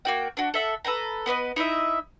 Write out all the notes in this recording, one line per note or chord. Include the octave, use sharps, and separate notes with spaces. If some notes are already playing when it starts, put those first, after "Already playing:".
A#3 F#4 G5
D4 F#4
A4 E5 F#5
A4 B4 G5 A#5
B3 B4 D5 D#5
D#4 E4 D#5 E5